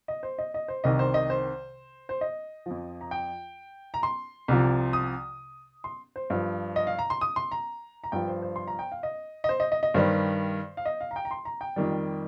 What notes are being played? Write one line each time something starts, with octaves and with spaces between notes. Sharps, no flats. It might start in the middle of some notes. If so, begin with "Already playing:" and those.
D#5
C5
D#5
D#5
C5
C2 C3 D#3 D#5
C5
D#5
C5
C5
D#5
F2 F3
A#5
G5
A#5
C6
C2 C3 F3
D#6
C6
C5
G2 F3
D#5
F5
A#5
C6
D#6
C6
A#5
A#5
G2 F3 G5
C5
C5
C6
A#5
G5
F5
D#5
D#5
C5
D#5
D#5
D#5
G2 D#3 G3 C5
F5
D#5
F5
A#5
G5
A#5
C6
A#5
G5
F2 D#3 G3